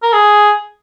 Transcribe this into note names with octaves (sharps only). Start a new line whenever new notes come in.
A#4
G#4